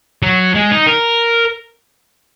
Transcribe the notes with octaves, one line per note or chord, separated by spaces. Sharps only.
F#3
G#3
D#4
A#4